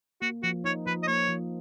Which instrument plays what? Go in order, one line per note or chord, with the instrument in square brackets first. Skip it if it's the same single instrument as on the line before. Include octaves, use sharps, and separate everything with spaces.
[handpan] A#3 [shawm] F#4
[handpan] F3 [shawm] F#4
[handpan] D#4 [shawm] C#5
[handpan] F3 [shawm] B4
[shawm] D#5
[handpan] A#3 [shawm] C#5
[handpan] F3